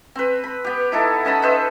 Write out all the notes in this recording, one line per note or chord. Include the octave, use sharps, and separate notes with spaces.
C4 B4
B5
B3 G4
D#4 E4 A4
C#4 D#5 A5 B5
D#4 B4 C5 E5